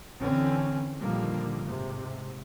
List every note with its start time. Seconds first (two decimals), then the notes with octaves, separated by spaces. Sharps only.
0.21 D3 E3 C4 C#4
0.99 A#2 D3 D#3 F3 G3 A#3
1.64 G#2 C3